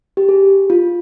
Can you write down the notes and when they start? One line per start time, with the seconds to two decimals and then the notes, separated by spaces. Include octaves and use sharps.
0.17 G4
0.29 G#4
0.70 F4